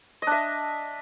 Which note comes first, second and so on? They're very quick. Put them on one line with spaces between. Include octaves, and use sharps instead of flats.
D#5 D4 E5